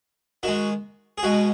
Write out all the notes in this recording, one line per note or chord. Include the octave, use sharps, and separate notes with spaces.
D#3 G#3 F#4
G#4
B2 G#3 F#4